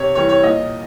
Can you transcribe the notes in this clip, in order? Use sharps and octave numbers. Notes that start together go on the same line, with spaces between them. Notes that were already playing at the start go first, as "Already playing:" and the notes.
Already playing: C3 C#5
E3 G3 C#5
C#5
A#2 D#5